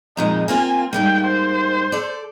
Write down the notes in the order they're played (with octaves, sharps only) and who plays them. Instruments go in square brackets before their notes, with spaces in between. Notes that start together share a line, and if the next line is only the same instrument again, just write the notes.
[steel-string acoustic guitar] F2 A#2 G#3 [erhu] D#4
[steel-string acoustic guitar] A#3 C4 F4 [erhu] G#5
[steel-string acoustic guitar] G#2 G3 A#3 [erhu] G5
[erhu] C5
[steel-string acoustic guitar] A4 D5